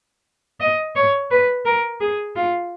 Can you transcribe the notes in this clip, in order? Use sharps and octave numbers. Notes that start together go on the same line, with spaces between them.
D#5
C#5
B4
A#4
G#4
F4